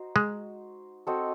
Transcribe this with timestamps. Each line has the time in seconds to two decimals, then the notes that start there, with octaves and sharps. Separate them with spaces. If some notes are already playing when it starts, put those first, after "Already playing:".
Already playing: D#4 F#4 C5
0.16 G#3
1.07 C4 F#4 A4 D#5